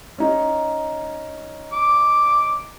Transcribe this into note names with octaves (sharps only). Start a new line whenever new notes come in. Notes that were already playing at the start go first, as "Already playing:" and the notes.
C#4 D#4
D6